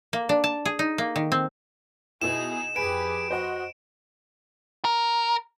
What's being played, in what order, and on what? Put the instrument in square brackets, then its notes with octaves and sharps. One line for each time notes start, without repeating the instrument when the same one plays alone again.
[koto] A#3
D4
A5
G#4
D#4
A#3
D#3
C4
[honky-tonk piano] B2 B3 E4 [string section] D#4 G#4 [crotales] E7
[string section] F2 G4 B4 [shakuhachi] G#4 [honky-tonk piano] G#5 [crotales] D7
[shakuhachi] F#4 [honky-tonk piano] C5 D#5 F#5
[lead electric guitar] A#4